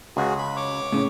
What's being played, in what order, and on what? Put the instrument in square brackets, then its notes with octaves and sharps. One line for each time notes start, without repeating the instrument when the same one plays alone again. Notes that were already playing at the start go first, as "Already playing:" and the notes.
[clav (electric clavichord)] C#2 [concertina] F#4 G#4
[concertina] B5
C#5 D6
[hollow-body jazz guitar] A2 C#3